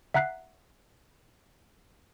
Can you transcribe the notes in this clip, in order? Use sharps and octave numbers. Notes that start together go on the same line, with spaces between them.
E5 F#5 A#5 F#6 B6 C7